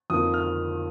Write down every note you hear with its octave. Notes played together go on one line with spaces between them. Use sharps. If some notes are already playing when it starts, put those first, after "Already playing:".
F2 D#3 A#3 D#6
F6